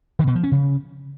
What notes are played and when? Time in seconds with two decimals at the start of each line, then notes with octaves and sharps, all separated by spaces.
0.19 D#3
0.27 B2
0.35 F3
0.43 C#4
0.52 C#3